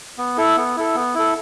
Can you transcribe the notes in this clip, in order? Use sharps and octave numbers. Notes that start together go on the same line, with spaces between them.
B3
E4 A4
B3
E4 A4
B3
E4 A4